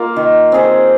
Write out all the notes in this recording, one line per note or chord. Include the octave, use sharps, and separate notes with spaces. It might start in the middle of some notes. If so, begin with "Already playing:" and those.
Already playing: A#3 F4 A#4
D#3
C4 G#4 C5